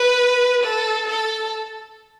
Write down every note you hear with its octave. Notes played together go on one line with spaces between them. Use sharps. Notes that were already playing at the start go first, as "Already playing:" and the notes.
Already playing: B4
A4
A4